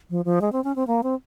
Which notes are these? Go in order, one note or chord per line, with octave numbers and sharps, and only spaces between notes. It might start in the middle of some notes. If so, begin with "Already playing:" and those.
F3
F3
G#3
C4
C#4
C4
A#3
C4